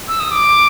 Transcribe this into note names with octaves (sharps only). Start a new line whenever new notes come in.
E6
D#6
D6